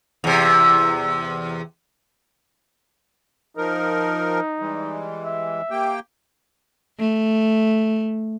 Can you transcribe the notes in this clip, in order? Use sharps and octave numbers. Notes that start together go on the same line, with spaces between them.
E2 C3
F3 D#4 A#4
E3 G3 G#3
E5
A#3 G4 G5
A3